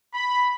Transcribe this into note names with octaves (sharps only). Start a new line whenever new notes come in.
B5